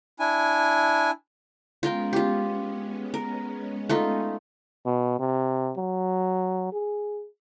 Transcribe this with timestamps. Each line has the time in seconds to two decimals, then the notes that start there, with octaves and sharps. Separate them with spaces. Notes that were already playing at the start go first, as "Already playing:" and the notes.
0.20 D4 E4 G#5
1.83 G#3 B3 C#4 F4 A#4 G5
2.13 F4 G4
3.14 A#4
3.89 A3 D#4 F4
4.86 B2
5.19 C3
5.77 F#3
6.73 G#4